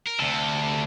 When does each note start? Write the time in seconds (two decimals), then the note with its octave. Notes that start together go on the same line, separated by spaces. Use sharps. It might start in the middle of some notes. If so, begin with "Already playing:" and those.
0.07 A#4
0.20 D2 C3 A4